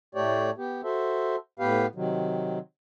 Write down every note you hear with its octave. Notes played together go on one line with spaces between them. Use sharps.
A2 A3 G4 C#5 D5
B3 G4
F#4 A4 C5 E5
A2 B3 G4 B4 F5
C3 D#3 F#3